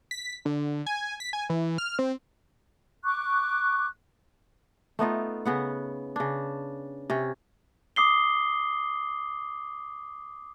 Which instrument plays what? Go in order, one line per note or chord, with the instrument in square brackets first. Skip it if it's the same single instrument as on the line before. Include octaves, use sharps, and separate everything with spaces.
[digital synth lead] B6
D3
G#5
B6
G#5
E3
F6
C4
[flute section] C#6 D6 F#6
[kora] A3 B3 D#4 F4
C#3 B3 F#5
C#3 D4
C3 C#4
[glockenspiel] D6 D#6 C7 G7